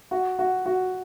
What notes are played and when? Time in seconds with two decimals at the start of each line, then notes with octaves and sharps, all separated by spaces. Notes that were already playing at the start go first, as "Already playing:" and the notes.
0.11 F#4
0.39 F#4
0.66 F#4